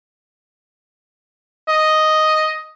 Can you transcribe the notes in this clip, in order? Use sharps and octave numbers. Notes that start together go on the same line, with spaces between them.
D#5